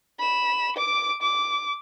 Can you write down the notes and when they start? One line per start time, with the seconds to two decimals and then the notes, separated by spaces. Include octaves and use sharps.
0.18 B5 E7
0.77 D6 D7
1.22 D6